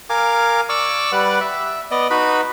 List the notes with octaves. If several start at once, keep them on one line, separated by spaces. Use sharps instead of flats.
A#4 F5 G#5 D6
D5 C#6 D6 E6
G3 B4 D5 F#5
E5
B3 D5 D#5
D#4 F#4 B4 B5